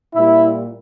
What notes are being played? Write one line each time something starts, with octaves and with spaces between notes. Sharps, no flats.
A#2 G3 E4